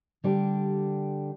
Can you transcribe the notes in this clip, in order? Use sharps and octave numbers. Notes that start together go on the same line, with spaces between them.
D3 G3 D4 G4